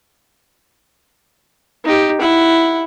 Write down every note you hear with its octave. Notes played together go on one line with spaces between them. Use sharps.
D#4 G4
E4 F#5